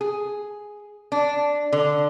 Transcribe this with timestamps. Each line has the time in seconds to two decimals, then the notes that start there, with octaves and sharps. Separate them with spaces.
0.01 G#4
1.12 D4
1.72 D3